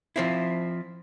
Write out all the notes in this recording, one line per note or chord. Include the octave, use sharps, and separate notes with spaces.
F3 C4 E4